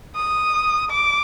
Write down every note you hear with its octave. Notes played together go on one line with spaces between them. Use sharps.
D#6
D6